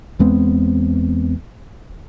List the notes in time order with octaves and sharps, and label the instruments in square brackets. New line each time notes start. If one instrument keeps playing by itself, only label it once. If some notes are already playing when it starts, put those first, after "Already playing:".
[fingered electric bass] E2 G#3 B3 C4